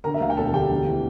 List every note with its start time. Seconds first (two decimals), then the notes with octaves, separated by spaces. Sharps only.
0.04 D3 A#4 A#5
0.14 E5
0.21 D2 F5
0.30 G5
0.37 E1 A4 A5
0.54 D2 G4 G5
0.71 E2
0.87 E3